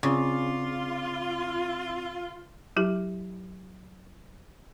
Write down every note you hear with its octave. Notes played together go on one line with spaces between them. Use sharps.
C#3 C4 F4 D5 D6
F#3 E4 G4